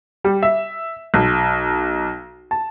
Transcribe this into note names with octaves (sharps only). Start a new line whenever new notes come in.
G3
E5
B1
A5